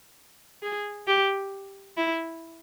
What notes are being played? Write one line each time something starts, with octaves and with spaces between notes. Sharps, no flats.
G#4
G4
E4